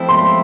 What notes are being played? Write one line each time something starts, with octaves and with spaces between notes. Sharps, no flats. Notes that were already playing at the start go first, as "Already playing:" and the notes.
Already playing: F3 A3 C4 E4
C6